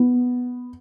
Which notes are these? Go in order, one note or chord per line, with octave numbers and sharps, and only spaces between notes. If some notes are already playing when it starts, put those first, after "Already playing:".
Already playing: B3